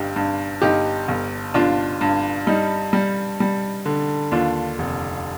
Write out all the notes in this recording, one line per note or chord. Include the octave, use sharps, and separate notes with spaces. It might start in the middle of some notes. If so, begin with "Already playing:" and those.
Already playing: G1 G2 D#4 G4
G2
G1 D#4 G4
G1
G1 D4 F4
G2
G3 D#4
G3
G3
D3
D#2 D4 F4
F1